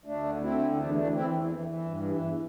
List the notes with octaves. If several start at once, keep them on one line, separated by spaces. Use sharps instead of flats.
D2 A3 D4
D3
D3 C4 E4
D2
E2 A3 D4
E3 A3 D4
E3 C4 E4
E2
E3
E3
G2
E3
E2